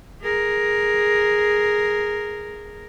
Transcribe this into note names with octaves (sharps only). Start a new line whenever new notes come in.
G#4 A#4